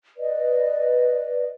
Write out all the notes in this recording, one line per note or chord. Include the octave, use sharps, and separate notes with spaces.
B4 D5 D#5